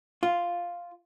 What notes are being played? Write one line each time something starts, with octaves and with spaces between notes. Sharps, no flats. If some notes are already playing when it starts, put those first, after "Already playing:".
F4